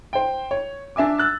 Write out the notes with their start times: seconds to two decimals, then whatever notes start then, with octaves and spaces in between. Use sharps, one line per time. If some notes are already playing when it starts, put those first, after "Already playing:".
0.13 C5 G5
0.51 C#5
0.96 D4 E5 G#5 D6
1.18 E6 F#6 A6